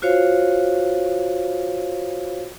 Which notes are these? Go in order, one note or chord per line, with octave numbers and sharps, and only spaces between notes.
F4 F#4 C5 C#5 F5